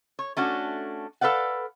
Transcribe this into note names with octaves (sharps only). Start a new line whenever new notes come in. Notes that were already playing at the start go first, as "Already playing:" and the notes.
C#5
A3 C#4 D4 F#4
A4 B4 D5 F5 F#5